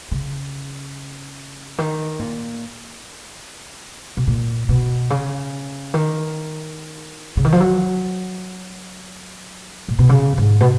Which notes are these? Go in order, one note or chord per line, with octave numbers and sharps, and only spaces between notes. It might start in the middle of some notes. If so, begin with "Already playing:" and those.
C#3
D#3
A#2
B2
A#2
B2
C#3
D#3
C#3
D#3
F3
F#3
A#2
B2
C#3
G#2
B2